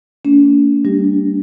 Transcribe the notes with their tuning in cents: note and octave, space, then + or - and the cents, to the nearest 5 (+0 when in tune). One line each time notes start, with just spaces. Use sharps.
A#3 -45 C#4 +45
G3 +0 D4 +0 G4 +0